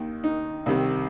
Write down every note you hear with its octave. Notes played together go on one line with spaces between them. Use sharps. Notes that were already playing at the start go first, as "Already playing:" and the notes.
Already playing: D#2 D#3
D#4
C2 C3 D#3